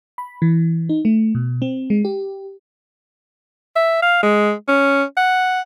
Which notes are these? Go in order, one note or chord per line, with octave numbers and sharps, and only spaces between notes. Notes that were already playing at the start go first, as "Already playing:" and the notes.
B5
E3
D#4
A3
B2
C4
G#3
G4
E5
F5
G#3
C#4
F#5